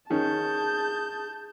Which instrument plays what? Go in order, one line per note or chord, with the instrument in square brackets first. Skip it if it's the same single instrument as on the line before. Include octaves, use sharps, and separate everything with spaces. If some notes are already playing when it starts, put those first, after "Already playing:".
[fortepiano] D#3 C#4 [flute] G#4 [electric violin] A5 G6